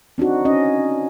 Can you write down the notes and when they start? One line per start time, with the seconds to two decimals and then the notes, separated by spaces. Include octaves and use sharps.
0.18 C4 D4 D#4 F#4
0.45 C#4 D#5